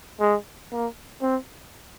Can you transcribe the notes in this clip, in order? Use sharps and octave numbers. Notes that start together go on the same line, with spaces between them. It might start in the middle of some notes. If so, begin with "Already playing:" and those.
G#3
A#3
C4